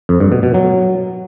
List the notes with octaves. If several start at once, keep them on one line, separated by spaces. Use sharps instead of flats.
F2
G2
B2
B2
F#3